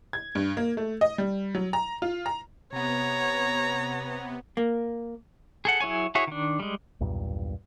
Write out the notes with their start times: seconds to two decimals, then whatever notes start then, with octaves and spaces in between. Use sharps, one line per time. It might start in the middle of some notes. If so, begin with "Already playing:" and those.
0.13 G#6
0.35 G2
0.57 A#3
0.77 A3
1.01 D#5
1.18 G3
1.55 F#3
1.73 A#5
2.02 F4
2.26 A#5
2.73 C3 B3 C#5 A#5
4.57 A#3
5.65 G#4 A4 F#5
5.80 F#3 E4 G#4 C#5 G#5
6.15 E4 F#4 G#4 C#5 E5
6.27 D#3 D4
6.60 G3 G#3
7.00 B1 E2 G2 A#2